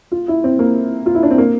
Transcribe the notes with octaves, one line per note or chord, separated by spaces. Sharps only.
F4
E4
C4
A#3
F4
E4
D4
C4
A#3